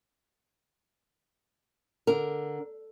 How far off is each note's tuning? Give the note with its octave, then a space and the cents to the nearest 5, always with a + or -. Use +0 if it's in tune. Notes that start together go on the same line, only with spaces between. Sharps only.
D3 +0 A#4 +0